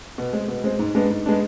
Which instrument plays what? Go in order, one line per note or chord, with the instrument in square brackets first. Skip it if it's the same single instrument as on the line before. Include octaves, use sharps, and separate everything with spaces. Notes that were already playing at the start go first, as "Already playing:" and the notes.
[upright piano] B2
G#3 C4
B2
G#3 C4
G#2
G#3 B3 D4
G#2
G#3 B3 D4